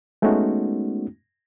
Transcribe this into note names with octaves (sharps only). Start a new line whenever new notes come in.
G#3 A3 B3 C#4 D#4 F#4